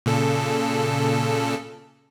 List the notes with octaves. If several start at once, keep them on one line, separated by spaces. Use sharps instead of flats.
A#2 C#3 A4